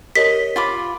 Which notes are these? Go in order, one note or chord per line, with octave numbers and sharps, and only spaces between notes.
G4 A#4 C#5 D#5 B6
F4 B5 D6